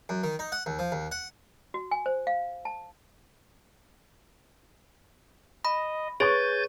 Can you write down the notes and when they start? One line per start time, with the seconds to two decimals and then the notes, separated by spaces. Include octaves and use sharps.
0.09 F#2
0.23 D#3
0.39 D#4
0.52 F#5
0.66 D#2
0.79 F3
0.92 D#2
1.11 F#5
1.74 F#4
1.91 G#5
2.06 C5
2.27 F5
2.65 A5
5.65 D#5 B5
6.20 G#4 B4 C#5 G#5 C#6 G6 A6